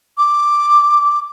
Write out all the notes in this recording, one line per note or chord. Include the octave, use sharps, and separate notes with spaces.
D6